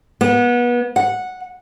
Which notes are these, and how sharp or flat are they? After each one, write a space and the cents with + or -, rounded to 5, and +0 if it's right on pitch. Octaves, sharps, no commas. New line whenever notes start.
B3 -30
F#5 -10